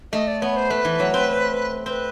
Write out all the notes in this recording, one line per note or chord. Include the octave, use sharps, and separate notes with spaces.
A3 D#5
D5
B3 C#5
C5
A3 B4
E3
F#3
C4
C4 B4 C5